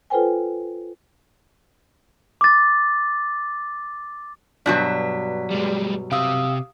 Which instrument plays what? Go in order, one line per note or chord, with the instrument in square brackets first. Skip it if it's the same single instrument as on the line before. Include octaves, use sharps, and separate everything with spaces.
[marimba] F4 A4 B4 C5 G5 G#5
[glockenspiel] D6 A6
[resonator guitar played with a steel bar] G2 B2 F#3 [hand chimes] D5 B6
[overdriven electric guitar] G3 G#3
[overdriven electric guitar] C3 G4 [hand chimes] F5 D#6 E6